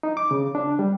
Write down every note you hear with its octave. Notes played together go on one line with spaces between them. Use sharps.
D#4
D6
C#3
D4
G3